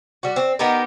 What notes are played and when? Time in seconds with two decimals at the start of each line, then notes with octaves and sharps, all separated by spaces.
0.23 G3 F#4
0.36 C4
0.59 B3 D#4 G4 A#4